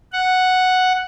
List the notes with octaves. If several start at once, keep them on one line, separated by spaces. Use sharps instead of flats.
F#5